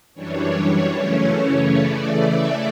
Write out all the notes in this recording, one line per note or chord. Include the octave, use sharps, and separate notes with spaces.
F#2 E3 G3 D4 C#5
C#5
F#2 C#3 E3 A3 C#4
C#3 E3 A3 D5
E5